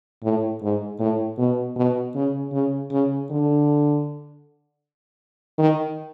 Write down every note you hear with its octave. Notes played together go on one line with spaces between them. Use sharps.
A2
G#2
A2
B2
B2
C#3
C#3
C#3
D3
D#3